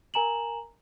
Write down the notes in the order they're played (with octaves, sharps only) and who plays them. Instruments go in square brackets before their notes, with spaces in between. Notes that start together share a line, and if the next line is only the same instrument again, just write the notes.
[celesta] A#4 G#5 A#5 E7 F#7